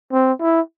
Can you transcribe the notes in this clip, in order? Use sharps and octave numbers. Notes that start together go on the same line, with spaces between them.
C4
E4